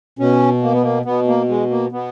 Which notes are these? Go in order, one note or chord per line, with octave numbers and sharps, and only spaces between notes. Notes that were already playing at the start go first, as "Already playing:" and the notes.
B2 C#4
A#3
B3
A#3
B2 B3
A#3
G#3
A#3
B2 B3